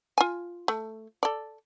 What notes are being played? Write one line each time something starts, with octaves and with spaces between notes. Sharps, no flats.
F4 G#5
A3
A4 D5